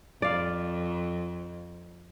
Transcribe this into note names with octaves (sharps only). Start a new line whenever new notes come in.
F2 D5 F5